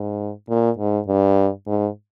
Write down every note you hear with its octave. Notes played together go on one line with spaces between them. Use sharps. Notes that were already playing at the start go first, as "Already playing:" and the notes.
Already playing: G#2
A#2
G#2
G2
G#2